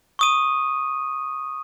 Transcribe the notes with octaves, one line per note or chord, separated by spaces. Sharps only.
C#6 D#6 D#7